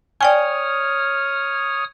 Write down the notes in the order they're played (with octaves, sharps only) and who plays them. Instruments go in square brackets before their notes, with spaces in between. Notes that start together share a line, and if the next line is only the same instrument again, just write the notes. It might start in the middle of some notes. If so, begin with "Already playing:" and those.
[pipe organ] C#5 D#6 F6 [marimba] D5 G5 G#5